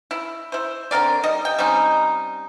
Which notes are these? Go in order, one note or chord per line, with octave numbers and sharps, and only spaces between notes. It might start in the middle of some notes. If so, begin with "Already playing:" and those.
E4
E4 C5
D3 C4 A#4 D5
G3 D#4 D#5
G5
G3 C4 C#4 D#4